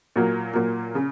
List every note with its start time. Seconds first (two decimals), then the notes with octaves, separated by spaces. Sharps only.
0.16 A#2 F#3 A#3
0.54 A#2 F#3 A#3
0.95 C#3